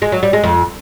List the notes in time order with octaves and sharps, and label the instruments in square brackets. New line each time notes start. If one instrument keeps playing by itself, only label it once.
[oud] G#3
F#3
G3
G#3
F2